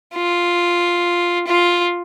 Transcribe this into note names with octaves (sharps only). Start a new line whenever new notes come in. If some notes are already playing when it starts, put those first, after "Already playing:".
F4
F4